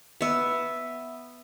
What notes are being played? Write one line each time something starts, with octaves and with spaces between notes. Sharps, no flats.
B3 E5